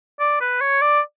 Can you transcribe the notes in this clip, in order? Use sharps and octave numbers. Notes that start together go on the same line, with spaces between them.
D5
B4
C#5
D5